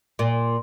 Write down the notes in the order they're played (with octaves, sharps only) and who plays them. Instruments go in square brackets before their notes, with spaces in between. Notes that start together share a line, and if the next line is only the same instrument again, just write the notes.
[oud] A#2